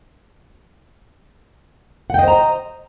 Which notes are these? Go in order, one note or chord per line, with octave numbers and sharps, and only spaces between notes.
C5 D#5 F#5 G5 A#5